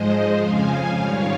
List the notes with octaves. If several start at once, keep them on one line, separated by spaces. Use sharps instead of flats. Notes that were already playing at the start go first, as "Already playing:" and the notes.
Already playing: G#2 F3 G#3 C5 D#5
F2 C#3 F3 F5 G#5
G#2 D#3 G3 C#5 F5